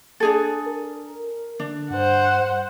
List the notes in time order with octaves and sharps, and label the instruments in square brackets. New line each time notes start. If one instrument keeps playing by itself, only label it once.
[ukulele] D4 G#4 A4
[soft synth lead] A#4
[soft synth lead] D3 [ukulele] D4
[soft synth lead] G2 [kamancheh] C5 F#5